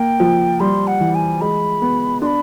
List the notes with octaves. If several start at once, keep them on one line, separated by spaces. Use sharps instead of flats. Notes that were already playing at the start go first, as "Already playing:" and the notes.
Already playing: A#3 G5
F3
G3 C6
F#5
E3
G#5
G#3 B5
B3
D4 B5 C6